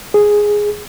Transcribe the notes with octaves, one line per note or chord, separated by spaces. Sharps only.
G#4